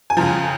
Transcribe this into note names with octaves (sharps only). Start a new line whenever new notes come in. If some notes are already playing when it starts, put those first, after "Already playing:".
G#5
F2 C#3 F3 A#5